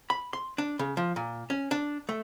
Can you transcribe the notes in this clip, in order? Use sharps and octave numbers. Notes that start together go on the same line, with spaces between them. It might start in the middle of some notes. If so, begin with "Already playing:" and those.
B5
C6
D4
C#3
F3
A#2
C#4
D4
A3